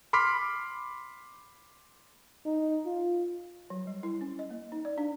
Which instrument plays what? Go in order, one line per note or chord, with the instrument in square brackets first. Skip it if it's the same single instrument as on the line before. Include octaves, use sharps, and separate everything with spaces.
[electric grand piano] B5 C6 D6 F6 B6
[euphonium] D#4
F4
[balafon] F#3
G3
E4
C#4
D#5
A#3
D#4
D5
D4